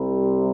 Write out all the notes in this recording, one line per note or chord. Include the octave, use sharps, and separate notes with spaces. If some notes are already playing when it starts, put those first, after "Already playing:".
Already playing: C2 C3 G3